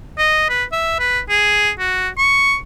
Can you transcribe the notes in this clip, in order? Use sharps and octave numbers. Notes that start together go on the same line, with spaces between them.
D#5
B4
E5
B4
G#4
F#4
C#6